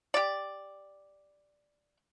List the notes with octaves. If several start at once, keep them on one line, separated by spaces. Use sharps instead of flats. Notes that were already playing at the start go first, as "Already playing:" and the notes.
G4 D5